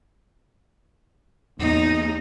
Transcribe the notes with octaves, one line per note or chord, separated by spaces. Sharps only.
E2 A#3 B3 D#4